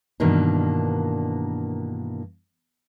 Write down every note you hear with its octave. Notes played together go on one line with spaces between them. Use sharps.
G2 B2 D#3 E3 A#3 D4